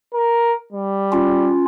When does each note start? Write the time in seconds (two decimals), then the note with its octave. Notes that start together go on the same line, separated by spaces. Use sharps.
0.14 A#4
0.73 G3
1.12 C#4 F4